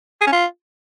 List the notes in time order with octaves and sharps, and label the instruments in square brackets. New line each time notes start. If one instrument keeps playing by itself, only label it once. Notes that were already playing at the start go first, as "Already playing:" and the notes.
[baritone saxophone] G#4
C#4
F4